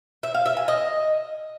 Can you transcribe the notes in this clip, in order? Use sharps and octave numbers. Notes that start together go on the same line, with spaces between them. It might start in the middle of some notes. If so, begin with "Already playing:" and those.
E5
F5
E5
G#5
D#5